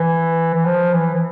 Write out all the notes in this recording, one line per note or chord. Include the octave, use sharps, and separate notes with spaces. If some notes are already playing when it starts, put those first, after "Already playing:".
Already playing: E3
E3
F3
E3
E3